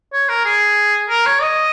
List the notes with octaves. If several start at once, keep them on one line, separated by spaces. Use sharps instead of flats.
C#5
A#4
G#4
A#4
C#5
D#5